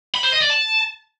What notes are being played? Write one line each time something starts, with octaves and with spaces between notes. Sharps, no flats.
B5
C5
D#5
D5
A5